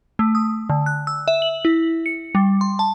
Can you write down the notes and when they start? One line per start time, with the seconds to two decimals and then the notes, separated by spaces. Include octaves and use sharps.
0.19 A3
0.35 D#6
0.70 D3
0.86 F#6
1.07 E6
1.28 E5
1.42 F#7
1.65 E4
2.06 C#7
2.35 G3
2.61 C6
2.79 A5